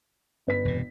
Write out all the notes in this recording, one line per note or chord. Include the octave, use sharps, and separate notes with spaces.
G1 B4 B6
E1 C3